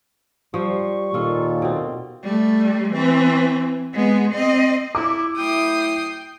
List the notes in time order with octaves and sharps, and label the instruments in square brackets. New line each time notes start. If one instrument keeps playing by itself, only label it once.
[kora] F3 C5 [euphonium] G3 [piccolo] C#6
[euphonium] D#2 [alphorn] A#2 [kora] F4 A4
[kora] B2 C4
[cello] G3 A3
E3 C4
G#3 B3
C4 D#5
[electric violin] E4 [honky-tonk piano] D6
[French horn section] F#3 A3 E4 [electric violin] G5 [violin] D#6 C7